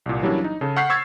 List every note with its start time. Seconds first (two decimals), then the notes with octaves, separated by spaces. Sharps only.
0.06 C2 A#2
0.22 E3 F#3 G3 A#3 C#4 D4
0.44 D#4
0.61 C#3 A4
0.76 F#5 C#6 F6 G6 B6 C7
0.90 C#6 E6 G#6 A6